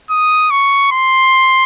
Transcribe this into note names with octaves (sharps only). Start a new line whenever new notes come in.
D#6
C#6
C6